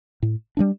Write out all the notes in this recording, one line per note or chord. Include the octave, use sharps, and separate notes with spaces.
A2
G3 A#3 D4